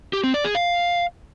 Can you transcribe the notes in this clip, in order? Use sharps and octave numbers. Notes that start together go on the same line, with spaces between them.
G4
C4
D5
G#4
F5